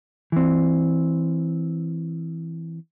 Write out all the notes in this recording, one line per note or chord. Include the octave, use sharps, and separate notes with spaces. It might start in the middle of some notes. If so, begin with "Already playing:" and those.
E3 C4